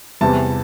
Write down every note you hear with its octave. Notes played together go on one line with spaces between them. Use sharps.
E2 C3 E3 G3 A5